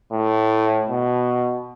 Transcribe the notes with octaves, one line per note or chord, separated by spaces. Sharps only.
A2
B2